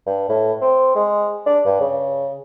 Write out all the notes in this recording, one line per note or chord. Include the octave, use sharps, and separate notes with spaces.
G2
A2
C4
G#3
D4
G2
C#3